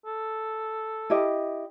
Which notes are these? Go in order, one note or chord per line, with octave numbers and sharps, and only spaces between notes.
A4
E4 G4 D#5